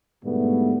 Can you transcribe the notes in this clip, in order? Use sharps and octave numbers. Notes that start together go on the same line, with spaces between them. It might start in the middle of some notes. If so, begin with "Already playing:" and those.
G#2 B2 D3 G3 A3 B3